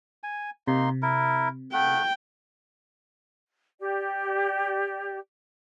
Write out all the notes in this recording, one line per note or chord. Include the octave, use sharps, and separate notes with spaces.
G#5
C3 A#3 D#4 C6
E4 A#4
A3 F#5 G5
G4 D5